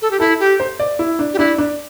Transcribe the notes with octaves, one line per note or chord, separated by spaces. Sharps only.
A4
G4
E4 A4
G4
C5
D5
E4
D4
G4
D4 E4
D4